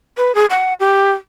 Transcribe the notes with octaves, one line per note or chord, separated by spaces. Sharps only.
B4
G#4
F#5
G4